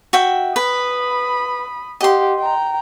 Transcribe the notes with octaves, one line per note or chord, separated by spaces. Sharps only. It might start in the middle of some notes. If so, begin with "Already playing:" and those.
F#4 E5 G5
B4 B5 D#6
G4 D#5 F#5 C6
G5 A#5